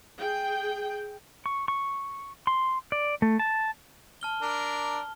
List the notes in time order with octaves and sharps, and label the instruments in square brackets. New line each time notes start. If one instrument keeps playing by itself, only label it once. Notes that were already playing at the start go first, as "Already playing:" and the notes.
[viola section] G#4 G5
[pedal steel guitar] C#6
C#6
C6
D5
A3
A5
[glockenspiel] A5 F6 G7
[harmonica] D4 A#4